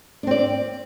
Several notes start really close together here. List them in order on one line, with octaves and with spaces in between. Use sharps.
D4 C4 D5